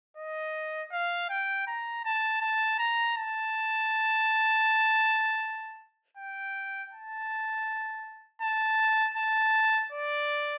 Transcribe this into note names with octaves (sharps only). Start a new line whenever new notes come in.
D#5
F5
G5
A#5
A5
A5
A#5
A5
G5
A5
A5
A5
D5